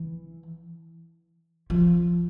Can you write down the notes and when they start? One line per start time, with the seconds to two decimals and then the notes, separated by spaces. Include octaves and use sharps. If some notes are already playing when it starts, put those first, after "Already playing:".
Already playing: E3
1.70 F3